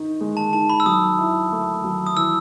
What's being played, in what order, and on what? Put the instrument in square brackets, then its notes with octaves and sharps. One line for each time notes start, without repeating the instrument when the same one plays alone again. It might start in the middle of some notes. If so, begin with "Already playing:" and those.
Already playing: [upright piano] D#3 D#4
G#3
[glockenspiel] A5
[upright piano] D#3 [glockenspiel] A5
[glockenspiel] B5
E6
[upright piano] F#3 [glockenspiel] D#6
[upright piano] E4
A3
F#3
[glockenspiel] D#6
[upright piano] E3 [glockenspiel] E6